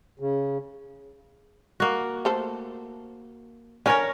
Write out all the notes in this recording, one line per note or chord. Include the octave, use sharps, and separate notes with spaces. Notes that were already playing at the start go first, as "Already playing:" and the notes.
C#3
A#3 F#4
A3 A4 C5
D3 C#4 A#4 C#5 G#5